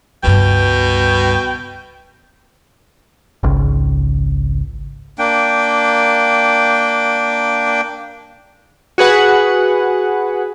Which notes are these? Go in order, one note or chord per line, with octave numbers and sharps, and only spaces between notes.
C#2 G2 B2 G5
G#1 C#2
A#3 D4 G5
F#4 G#4 B4 F#5